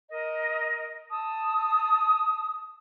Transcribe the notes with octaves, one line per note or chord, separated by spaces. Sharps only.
A#4 D#5
A5 D#6 E6